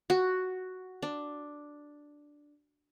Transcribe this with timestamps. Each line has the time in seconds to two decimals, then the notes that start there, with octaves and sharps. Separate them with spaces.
0.10 F#4
1.02 D4